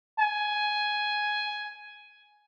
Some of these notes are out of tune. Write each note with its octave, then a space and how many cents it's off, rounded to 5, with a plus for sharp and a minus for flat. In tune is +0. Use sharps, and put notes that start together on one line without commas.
G#5 +10